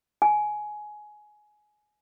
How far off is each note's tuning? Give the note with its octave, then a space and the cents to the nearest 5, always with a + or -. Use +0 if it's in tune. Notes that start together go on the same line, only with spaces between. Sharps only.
G#5 +15